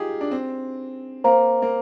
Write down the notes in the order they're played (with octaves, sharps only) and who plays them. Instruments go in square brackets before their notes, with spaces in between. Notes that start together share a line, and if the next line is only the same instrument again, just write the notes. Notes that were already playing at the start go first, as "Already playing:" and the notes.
Already playing: [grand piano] D#4 F4 G4 G#4
D4
C4
[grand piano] A#3 [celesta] C5 F5 A#5
[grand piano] A#3